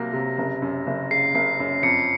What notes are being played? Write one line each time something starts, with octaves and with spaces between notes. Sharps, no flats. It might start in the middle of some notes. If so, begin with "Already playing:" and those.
Already playing: C2 C3 F#3 A#3 A#6
C3
F#1
F#2
F#1
C#3 C7
F#1 C7
F#2
F2 C#7